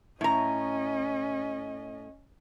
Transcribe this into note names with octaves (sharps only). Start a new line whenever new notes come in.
A2 C#4 D#5 A#5